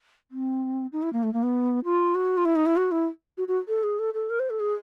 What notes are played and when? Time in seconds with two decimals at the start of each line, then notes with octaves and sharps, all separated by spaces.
0.31 C4
0.92 D#4
1.02 E4
1.13 A#3
1.23 A3
1.33 A#3
1.43 B3
1.84 F4
2.15 F#4
2.37 F4
2.45 E4
2.56 D#4
2.66 E4
2.77 F#4
2.91 E4
3.37 F#4
3.48 F#4
3.68 A4
3.83 G#4
3.99 A4
4.14 A4
4.30 A#4
4.39 C5
4.50 A4
4.60 G#4